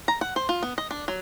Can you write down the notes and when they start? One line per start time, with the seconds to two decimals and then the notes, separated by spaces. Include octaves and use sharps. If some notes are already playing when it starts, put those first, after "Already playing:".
0.08 A#5
0.21 F#5
0.36 C5
0.49 F4
0.63 B3
0.78 D#5
0.91 D4
1.08 F#3